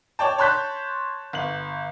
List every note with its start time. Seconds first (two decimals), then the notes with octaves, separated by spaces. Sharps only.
0.19 C#5 D5 G5 A5
0.38 C#5 A5 C6 F#6 G6 B6
1.33 G1 F#7